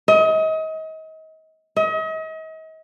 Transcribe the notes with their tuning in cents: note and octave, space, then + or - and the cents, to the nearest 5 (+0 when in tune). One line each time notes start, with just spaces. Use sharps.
D#5 +35
D#5 +40